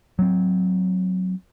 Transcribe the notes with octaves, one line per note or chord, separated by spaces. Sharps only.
F#3 C4